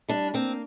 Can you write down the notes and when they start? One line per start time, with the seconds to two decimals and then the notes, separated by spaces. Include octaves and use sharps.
0.08 G3 D4
0.34 A#3 C4